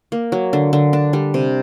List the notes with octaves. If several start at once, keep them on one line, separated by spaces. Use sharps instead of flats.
A#3
F#3
D3
D3
D4
G3
C3